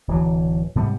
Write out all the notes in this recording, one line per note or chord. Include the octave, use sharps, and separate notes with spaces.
D1 E3 F#3
G#2 C3 G3 B3